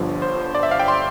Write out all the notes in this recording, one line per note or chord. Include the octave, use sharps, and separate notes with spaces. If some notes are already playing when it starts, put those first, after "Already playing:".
Already playing: G1 G2 D3 F3
C5
D5
E5
F5
G5
C6